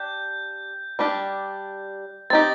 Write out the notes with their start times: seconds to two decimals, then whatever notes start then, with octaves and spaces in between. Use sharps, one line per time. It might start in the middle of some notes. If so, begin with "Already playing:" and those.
Already playing: D4 G4 G6
0.99 G3 D4 G4
2.30 C4 D#4 G4 A6